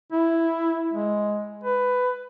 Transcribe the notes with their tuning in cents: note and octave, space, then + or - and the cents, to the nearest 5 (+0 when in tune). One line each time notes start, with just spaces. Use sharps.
E4 +5
G#3 +5
B4 +15